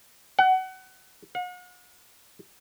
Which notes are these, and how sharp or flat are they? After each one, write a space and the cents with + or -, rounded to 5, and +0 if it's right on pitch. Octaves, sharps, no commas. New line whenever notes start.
F#5 +25
F#5 -45